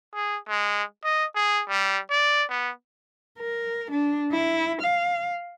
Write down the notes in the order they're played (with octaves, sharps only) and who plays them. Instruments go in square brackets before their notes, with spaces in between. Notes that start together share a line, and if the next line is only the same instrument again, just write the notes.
[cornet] G#4
G#3
D#5
G#4
G3
D5
B3
[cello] A#4
D4
E4
F5